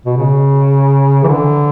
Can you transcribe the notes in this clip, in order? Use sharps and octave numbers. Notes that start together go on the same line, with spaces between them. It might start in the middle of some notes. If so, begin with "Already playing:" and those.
B2
C#3
E3
D3